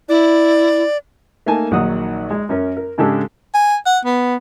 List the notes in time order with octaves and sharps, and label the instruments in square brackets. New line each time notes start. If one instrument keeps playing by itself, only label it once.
[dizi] E4 [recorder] D5
[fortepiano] A3 A#3 D#4 G#5 A5
A#1 D#3 F#3 D#4 F#5 D#6
G#3
F#2 C#4 A#4
A#4
G#2 C#3 G#3 D4 G4 A4
[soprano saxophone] G#5
F#5
B3